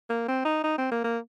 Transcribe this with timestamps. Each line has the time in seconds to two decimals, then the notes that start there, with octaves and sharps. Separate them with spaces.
0.09 A#3
0.28 C4
0.45 D#4
0.64 D#4
0.78 C4
0.91 A#3
1.04 A#3